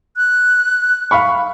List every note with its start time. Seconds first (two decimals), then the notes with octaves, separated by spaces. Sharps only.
0.17 F#6
1.11 F5 B5 C#6